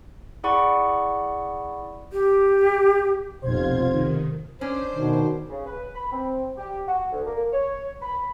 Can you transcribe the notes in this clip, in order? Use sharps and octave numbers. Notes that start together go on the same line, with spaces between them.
E4 G#4 D5 F#5 B5 C#6
G4
F1 B1 B2 F4 C5 G#6
D#3
C#4 D4 C5
B2 D#3
C#3
B4
B5
C4
G4
F#4
D2
A#3
C#5
B5